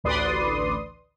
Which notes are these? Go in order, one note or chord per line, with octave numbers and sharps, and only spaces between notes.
A1 D2 B4 D5 C6 D#6